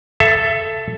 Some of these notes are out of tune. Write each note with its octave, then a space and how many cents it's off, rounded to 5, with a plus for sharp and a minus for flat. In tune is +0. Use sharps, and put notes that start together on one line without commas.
A4 +0 E5 +25